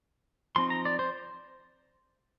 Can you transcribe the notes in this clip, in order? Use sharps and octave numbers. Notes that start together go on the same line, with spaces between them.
F3 C4 D#4 C6
A#5
D5
C5